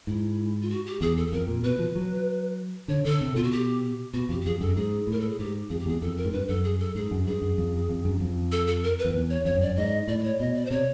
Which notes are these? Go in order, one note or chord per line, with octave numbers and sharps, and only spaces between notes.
G#2 E4
F4
F#4
G4
E2 G#4
A4
A4
F2 A#4
A#2
B2 B4
F3
F#3
D3 C#5
D3 A4
C3
B2 F4
F#4
G4
B2 F#4
F2 G4
G4
F2 G#4
F#2 A4
G#2 G#4
A2 A#4
A4
G#4
G#2 G4
F2 G#4
G4
E2 G#4
F2 A4
A#4
G#2
G2 B4
F#2 A4
G#4
A4
G#2 G#4
F#2
G2 G#4
F#2
F2
F2
F#2
F2
A4
A4
A#4
B4
F2
E2
C#5
F2 C#5
F#2
D5
F#2
G#2 D#5
A2 D5
D5
C#5
B2 D#5
D5
C5
C3 C#5